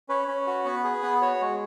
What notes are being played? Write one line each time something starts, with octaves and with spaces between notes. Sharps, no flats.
C#4 B4
C#4
F#4
B3
G#4
B3
F#4 C#5
G#3